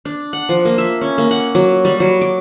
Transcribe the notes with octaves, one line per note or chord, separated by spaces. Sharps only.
D4
F#5
F3
A#3
E5
C#4
A#3
F#5
F#3
G3
F#3
D6